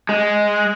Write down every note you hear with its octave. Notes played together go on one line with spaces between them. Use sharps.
G#3